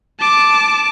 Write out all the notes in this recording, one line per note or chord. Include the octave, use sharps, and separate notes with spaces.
A5 D6